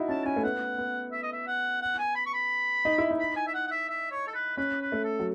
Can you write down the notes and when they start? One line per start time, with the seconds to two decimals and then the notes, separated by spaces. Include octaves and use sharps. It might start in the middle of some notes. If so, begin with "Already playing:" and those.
Already playing: D#4 E4 F#4
0.09 C#4 A5
0.25 C#4 G#5
0.36 A3
0.44 B3 F#5
0.78 B3
1.12 E5
1.23 D#5
1.33 E5
1.47 F#5
1.82 F#5
1.98 G#5
2.15 B5
2.26 C#6
2.34 B5
2.85 D#4
2.98 E4
3.11 D#4
3.19 B5
3.36 G#5
3.47 E5
3.54 F#5
3.67 F#5
3.71 E5
3.89 E5
4.12 C#5
4.27 A4
4.35 B4
4.57 C#4 B4
4.81 B4
4.92 A3
5.04 A4
5.19 F#3